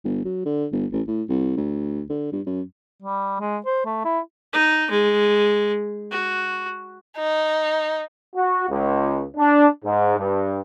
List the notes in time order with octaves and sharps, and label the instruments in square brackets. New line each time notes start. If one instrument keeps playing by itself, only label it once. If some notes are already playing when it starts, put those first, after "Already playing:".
[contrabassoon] G1
F#3
D3
G1
A1
A2
C2
D2
D3
G2
F#2
[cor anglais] G3
G#3
C5
A3
E4
[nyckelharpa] D#4
G#3
F#4
[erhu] D#4
[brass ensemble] F#4
C#2
D4
G#2
G2